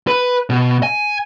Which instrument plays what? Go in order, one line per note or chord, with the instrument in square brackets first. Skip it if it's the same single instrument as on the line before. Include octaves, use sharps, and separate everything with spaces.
[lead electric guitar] B4
B2
G#5